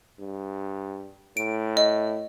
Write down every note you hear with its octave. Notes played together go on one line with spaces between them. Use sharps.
G2
A2 D7
D#5